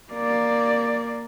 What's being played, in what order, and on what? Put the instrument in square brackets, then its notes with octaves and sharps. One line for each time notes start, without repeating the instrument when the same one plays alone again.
[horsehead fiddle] A#3 D5